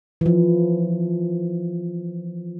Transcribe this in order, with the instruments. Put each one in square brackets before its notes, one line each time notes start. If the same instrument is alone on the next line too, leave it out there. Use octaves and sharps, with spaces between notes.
[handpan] E3 F3